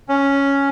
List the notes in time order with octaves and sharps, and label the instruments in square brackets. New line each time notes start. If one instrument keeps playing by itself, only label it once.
[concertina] C#4